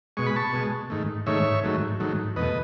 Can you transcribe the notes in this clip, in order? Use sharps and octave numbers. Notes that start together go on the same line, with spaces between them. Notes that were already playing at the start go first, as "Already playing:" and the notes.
B2 G#3 C#6
B5
A5 C#6
B2 G#3
G#2 D#3 A3
G#2 D#3 A3 C#5 E5
G#2 D#3 F#3 A3
G#2 D#3 F#3 A3
E2 B2 A3 B4 D#5